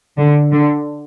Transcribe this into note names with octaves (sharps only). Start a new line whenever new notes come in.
D3
D3